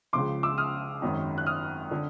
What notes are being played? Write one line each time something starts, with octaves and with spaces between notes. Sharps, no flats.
C#2 C#3 F3 C6 D6
D6 E6
D#6 F6
G#1 F#2 D#3
F#6
D#6 F6
D3